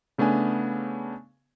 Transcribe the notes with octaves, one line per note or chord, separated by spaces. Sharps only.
C#3 A3 B3 D4 G#5